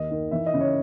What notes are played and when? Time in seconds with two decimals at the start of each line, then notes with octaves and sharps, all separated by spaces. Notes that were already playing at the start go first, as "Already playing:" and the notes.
Already playing: D#2 D#5
0.10 D#3
0.31 E3 E5
0.46 D#5
0.53 C#3
0.61 C#5